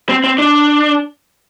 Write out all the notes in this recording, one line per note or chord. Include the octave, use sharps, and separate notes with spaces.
C4
C4
D4